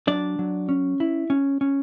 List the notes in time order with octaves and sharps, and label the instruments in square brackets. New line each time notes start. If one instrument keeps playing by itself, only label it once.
[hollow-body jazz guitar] F#3 D4 D5
F#3
C#4
E4
C#4
C#4